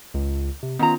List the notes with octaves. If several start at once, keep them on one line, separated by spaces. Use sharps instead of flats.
C#2
C3
D#3 B3 C#4 F4 A#5